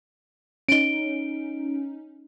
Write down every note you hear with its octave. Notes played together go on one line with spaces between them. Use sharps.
C#4 D#4 D7 G7